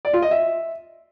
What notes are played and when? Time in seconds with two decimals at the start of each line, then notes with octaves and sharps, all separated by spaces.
0.05 D5
0.14 F4
0.22 D#5
0.31 E5